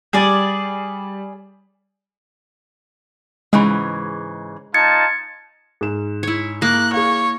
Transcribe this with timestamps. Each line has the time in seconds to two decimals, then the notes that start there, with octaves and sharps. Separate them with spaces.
0.13 G3 G#4 D5
3.53 G#2 C#3 E3 G#3
4.74 D#4 F4 A5 G#6 A6 C#7
5.81 G#2 E7
6.23 E4 C#5
6.62 A#3 F#6
6.93 G#4 C#5 F5